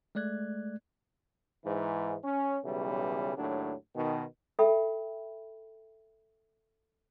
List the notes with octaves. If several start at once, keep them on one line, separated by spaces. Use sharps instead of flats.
G#3 A3 D5 F#6 G#6
G#2 E3
C#4
B1 C#3 E3 G3
D#2 A2 F#3 D4
B2 D#3
A4 E5 G5 B5